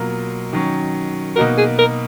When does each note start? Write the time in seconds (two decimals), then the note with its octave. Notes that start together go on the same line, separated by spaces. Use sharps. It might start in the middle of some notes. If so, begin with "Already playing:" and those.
Already playing: B2 F#3 A#3 F4 A#4
0.53 D#3 F#3 C#4
1.36 B2 A#3 D#4 F#4 A#4
1.58 G#4
1.79 A#4